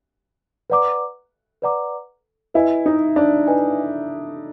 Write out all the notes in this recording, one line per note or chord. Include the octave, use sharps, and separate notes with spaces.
B4 D5 F#5 A#5 D6
B4 D5 F#5 A#5 D6
E4 B4 D#5 G#5
D#4
D4
B4 D#5 G#5